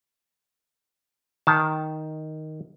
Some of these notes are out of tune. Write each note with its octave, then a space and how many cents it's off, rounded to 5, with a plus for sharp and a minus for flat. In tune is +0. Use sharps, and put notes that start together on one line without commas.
D#3 +0 A5 +0